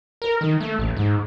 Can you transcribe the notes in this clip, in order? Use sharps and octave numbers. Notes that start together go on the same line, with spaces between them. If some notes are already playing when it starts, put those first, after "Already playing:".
A#4
D#3
A3
A1
G#2